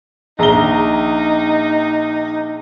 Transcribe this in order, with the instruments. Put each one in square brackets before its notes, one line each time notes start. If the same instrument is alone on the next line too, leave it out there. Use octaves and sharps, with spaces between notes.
[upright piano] A#1 A#5 G7 [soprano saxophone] D#4